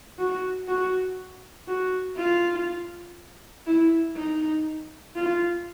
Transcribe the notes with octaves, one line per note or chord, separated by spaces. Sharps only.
F#4
F#4
F#4
F4
E4
D#4
F4